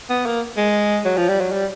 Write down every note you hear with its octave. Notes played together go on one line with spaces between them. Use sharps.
B3
A#3
G#3
F#3
F3
G3
F#3
G3